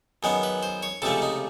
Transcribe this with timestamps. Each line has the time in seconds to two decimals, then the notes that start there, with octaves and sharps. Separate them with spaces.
0.23 F#2 D#3 G#3 B3
0.43 B4
0.63 C5
0.83 C#5
1.02 C#2 C3 F3 A3 C#4 A4
1.22 D#4